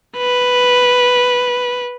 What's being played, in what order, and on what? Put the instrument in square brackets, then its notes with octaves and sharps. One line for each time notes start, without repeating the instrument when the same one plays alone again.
[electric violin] B4